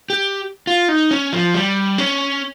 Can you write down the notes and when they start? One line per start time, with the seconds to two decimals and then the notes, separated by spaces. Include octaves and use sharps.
0.10 G4
0.67 F4
0.89 D#4
1.11 C#4
1.33 F3
1.54 G3
1.98 C#4